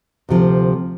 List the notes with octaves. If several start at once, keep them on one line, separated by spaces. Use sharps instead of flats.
D2 C3 F3